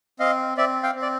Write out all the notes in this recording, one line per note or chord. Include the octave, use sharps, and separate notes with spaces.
C4 D#5 F5
C4 D5 E5
F5 G5
C4
D5